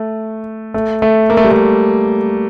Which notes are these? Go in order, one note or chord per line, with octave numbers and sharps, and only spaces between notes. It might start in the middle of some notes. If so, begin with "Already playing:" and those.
Already playing: A3
A3
A3
A#3
A3
G3
A3